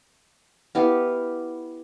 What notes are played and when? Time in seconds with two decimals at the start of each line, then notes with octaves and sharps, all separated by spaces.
0.75 B3 E4 G4 F5